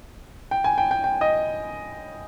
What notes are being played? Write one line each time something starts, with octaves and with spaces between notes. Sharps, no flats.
G5
G#5
G5
G5
G5
D#5